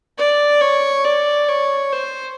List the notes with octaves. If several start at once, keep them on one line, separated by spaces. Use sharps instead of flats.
D5
C#5
D5
C#5
C5